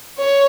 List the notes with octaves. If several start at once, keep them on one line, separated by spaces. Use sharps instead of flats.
C#5